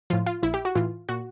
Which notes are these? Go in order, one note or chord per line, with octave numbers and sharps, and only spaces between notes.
A2 F3 F4
F4
A#1 E4
G4
F#4
A2 E3 F4
A#2 F#4